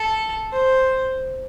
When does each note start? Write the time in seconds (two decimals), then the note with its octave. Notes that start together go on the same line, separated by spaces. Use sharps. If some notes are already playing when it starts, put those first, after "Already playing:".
Already playing: A4
0.53 C5